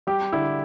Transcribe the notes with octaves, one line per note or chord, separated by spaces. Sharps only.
G3 G4
D3 E4